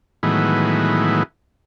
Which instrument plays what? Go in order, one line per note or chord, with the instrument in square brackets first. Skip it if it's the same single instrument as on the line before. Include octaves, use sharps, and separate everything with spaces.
[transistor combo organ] A2 D#3 E3 F#3 G#3 B3